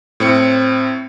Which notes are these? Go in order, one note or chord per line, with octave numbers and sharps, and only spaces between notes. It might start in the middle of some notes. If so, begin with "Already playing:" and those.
A2 C4 C#7